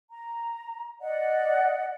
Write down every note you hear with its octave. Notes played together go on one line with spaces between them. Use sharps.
A#5
D5 D#5 F#5